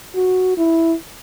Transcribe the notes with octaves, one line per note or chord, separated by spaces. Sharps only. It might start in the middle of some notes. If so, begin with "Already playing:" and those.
F#4
E4